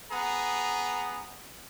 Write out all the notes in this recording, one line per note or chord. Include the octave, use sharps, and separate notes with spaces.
B3 G#4 F#5 A#5